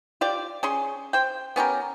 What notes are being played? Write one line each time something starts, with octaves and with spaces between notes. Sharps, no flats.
F4 G4 D5
C#4 G#4 C6
C5 G5
B3 C#4 G4 A#4